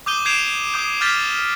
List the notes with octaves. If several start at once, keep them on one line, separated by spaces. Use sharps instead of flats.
D6 D#6 G6 D#7 G7
G6 G#6 C7 D7 E7 F7
D6 D#6 G6
D6 F6 G6 A6 B6 G7